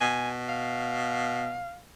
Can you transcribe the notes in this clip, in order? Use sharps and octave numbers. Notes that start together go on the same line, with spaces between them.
B2 G#5
F5